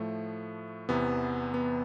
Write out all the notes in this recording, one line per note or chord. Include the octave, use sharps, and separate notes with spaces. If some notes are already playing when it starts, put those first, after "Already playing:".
Already playing: A2 F3 A3
E2 C3 E3 B3
B3